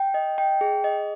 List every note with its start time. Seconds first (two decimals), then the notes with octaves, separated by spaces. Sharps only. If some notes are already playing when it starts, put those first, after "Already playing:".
Already playing: G5
0.14 D#5
0.38 G5
0.61 G#4
0.84 D#5